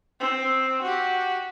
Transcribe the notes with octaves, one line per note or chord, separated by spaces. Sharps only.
C4
F#4 G4